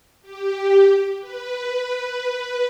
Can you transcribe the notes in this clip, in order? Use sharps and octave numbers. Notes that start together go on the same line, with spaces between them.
G4
B4